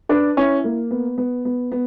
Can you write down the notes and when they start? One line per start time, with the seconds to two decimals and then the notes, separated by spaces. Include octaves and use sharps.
0.09 D4 B4
0.37 C#4 E4
0.64 A#3
0.91 B3
1.18 B3
1.45 B3
1.72 B3